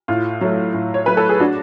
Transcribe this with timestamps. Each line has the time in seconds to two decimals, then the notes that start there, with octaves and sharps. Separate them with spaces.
0.08 A2 F4
0.41 F#3 A3
0.74 A2
0.94 C#5
1.06 F#3 A3 B4
1.17 A4
1.29 G#4
1.40 D4 F#4